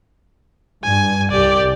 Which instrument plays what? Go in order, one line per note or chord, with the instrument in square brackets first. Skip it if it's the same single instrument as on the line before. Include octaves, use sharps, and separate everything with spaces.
[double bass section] G2 [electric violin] G#5
[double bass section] C2 [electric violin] G4 D5